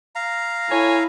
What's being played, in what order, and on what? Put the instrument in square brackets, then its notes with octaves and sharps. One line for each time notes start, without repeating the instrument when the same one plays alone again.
[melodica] F5 A#5
[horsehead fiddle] E4 [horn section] A4 C#5 G#5